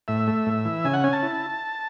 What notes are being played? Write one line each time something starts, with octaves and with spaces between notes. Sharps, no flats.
A2 E5
A3
A2
E3
C#3 G#5
F#5
C#4 G#5
A5
E4